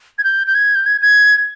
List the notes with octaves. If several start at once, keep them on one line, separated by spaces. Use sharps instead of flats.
G#6
G6
G6
G#6
G6
G#6
G#6